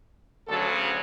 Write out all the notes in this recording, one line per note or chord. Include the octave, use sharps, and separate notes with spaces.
D2 C#3 F#3 A4